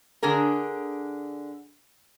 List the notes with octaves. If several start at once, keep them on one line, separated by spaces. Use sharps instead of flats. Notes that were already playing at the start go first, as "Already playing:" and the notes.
D3 D4 G#4 A#4